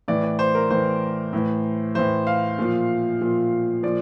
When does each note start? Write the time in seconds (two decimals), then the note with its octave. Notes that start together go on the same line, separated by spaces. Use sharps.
0.08 A2 E3 D5
0.24 D5
0.39 C5
0.55 A#4
0.70 A2 E3 C5
1.33 A2 E3
1.95 A2 E3 C5
2.27 F5
2.59 A#2 F3
3.21 A#2 F3
3.83 A#2 F3 D5